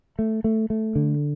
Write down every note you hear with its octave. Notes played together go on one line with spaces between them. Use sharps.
A3
A3
A3
D3